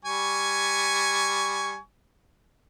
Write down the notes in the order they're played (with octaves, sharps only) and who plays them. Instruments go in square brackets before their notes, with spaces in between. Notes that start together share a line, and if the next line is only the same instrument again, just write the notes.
[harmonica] G3 G#5 C#6